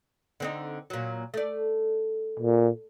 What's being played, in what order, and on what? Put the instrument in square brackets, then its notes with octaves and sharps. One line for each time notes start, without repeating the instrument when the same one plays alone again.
[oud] D3 C4 D#4
A#2 F#3
A3 D5
[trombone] A#2